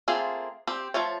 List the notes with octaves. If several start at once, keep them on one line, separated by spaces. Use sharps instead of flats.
A3 A#3 C4 F4 G#4
C4 G4
F3 A3 F4 C#5